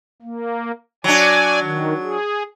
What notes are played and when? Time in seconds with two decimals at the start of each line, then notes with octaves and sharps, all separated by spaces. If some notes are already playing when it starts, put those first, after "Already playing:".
0.22 A#3
1.04 F#3 D4 D5 G#5
1.62 D#3
2.03 G#4